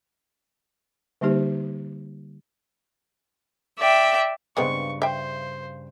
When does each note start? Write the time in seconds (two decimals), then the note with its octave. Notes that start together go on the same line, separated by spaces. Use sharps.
1.21 D3 G3 A#3 D#4 G4 C5
3.78 D5 E5 G5
4.57 G2 C#3 G#3 B3 C4 C#6
5.02 C5 E5 G5